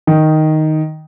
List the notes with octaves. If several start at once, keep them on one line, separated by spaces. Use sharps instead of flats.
D#3